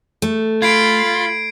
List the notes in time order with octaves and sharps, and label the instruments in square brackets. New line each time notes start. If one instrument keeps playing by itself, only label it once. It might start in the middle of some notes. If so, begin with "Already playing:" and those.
[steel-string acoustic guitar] A3
[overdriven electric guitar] F4 [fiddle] B5 [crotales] G#6 C7 D7